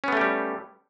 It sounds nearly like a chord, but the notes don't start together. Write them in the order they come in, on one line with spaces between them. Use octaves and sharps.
C#4 B3 A3 G4 G3